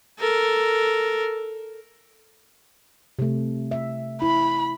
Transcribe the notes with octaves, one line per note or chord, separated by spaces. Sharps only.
A4 A#4
C3 A3
E5
E4 B5